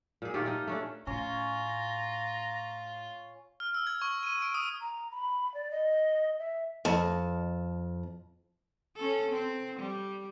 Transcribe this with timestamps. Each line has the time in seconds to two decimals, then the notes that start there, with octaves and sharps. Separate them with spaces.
0.22 A#2 G#4
0.34 D#3 A3 F4 G4
0.46 D#4 F4 D#5
0.67 A3 C#4 D4
1.07 A2 C#4 F4 A#5
3.60 F6
3.74 E6
3.87 G#6
4.02 C#6
4.23 D#7
4.42 D7
4.54 D#6
4.81 A#5
5.11 B5
5.54 D5
5.71 D#5
6.39 E5
6.85 F2 A5
8.96 C#4 A4
9.31 C4
9.79 G3